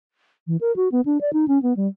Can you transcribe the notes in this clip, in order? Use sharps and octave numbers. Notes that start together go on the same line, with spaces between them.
E3
A#4
F#4
B3
D4
D5
D#4
C#4
B3
G3